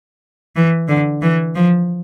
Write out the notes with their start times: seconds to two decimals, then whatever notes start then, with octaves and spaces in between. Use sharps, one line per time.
0.56 E3
0.88 D3
1.22 E3
1.55 F3